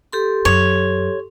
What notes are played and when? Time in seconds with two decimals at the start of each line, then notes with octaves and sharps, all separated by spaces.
0.13 G4 A4 C6
0.45 F#2 C#5